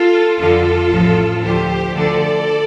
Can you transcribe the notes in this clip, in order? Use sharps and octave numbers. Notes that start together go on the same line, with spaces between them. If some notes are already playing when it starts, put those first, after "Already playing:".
Already playing: F4 A4
F2 D3 F3 F4 A4
A1 A2 F3
D2 D3 F3 G4 C5
D2 D3 F3 A4 D5